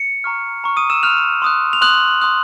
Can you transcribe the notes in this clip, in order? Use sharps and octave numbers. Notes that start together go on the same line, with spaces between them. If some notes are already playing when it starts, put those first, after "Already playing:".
Already playing: C#7
A#5 C#6 F6
A#5 C#6 F6
D#6 D#7
E6 E7
C6 D#6 F6 F#6 F7
C6 D#6 F#6
F7
C6 D#6 F#6 F#7
C6 D#6 F#6